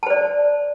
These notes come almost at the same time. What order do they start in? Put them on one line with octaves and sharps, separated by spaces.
A5 C5 D5